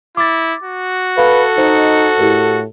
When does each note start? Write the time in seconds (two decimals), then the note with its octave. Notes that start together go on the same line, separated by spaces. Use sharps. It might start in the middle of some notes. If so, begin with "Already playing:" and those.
0.17 E4 D6 A6
0.63 F#4
1.18 A4 B4 F5
1.58 D#4 C5 D#5
2.19 A2 E4 G4 A#4